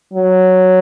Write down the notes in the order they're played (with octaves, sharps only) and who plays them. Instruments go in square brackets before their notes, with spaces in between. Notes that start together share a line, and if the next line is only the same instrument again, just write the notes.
[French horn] F#3